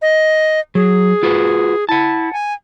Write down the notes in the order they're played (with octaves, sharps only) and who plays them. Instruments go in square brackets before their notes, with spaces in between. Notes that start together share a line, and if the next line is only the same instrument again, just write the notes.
[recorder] D#5
[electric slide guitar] F#3 [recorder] G#4
[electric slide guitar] F4 F#4 B4
[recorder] E4 [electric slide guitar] F#5 A5
[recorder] G#5